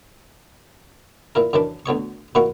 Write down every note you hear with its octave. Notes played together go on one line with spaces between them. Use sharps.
A#2 E4 A#4
F#2 D#3 E3 D4 B5
D2 B2 C#5 C#6
A#2 E3 A#3 E4 F#4 C#6